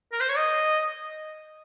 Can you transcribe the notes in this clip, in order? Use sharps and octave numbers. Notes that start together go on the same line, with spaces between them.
A#4
C5
C#5
D#5